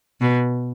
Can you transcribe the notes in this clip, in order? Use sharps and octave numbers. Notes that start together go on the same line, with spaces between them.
B2